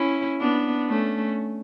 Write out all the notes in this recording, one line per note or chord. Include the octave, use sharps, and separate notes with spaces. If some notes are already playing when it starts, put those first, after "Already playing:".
Already playing: C#4 E4
B3 D4
A3 C#4